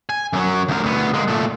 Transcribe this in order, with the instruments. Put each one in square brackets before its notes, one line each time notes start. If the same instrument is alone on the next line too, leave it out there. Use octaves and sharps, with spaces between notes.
[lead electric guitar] G#5
F#2 F#3
D2 A#4
D2 B3
G#3 A#3
A#2 A3